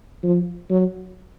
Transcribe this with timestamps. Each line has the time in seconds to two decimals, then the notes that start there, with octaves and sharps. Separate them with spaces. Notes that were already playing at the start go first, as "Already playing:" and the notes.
0.23 F3
0.70 F#3